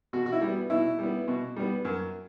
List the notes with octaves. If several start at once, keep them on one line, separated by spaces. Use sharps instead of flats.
B2 F#4
F#4
E4
G3 B3
B2 E4
G3 B3
B2
G3 B3
F#2